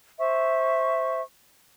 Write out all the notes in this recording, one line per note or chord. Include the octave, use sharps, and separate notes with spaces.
C5 E5 C#6